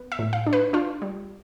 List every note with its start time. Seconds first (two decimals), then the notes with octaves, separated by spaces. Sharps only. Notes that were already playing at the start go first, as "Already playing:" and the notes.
Already playing: B3
0.12 E5
0.19 A2
0.33 F5
0.47 D4
0.53 B4
0.73 D4 F4
1.02 G3